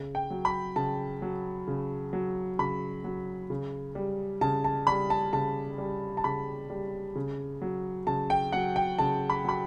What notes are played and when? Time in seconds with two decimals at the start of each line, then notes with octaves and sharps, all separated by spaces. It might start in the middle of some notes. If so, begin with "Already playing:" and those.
Already playing: C#3
0.15 G5
0.30 F#3
0.45 B5
0.76 C#3 A5
1.22 F#3
1.68 C#3
2.13 F#3
2.59 C#3 B5
3.04 F#3
3.50 C#3
3.95 G3
4.41 C#3 A5
4.64 A5
4.87 G3 B5
5.10 A5
5.33 C#3 A5
5.78 G3
6.17 A5
6.24 C#3 B5
6.70 G3
7.15 C#3
7.62 F#3
8.07 C#3 A5
8.30 G5
8.52 F#3 F#5
8.76 G5
8.98 C#3 A5
9.30 B5
9.45 F#3 B5